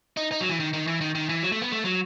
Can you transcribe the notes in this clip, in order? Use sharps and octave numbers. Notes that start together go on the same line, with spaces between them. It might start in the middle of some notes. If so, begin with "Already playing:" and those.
D#4
D#4
F#3
E3
D#3
D#3
E3
D#3
D#3
E3
F#3
A3
B3
A3
F#3